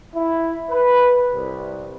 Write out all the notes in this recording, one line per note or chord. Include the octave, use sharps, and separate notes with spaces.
E4
B4
C2